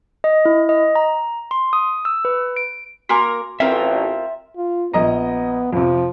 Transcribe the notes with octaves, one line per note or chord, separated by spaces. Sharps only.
D#5
E4
D#5
A#5
C6
D#6
E6
B4
D7
A#3 F#4 A#4 G#5 C6
A1 C4 F4 A#4 E5
F4
A#1 B3 D#5 A#5
F2 C3 F3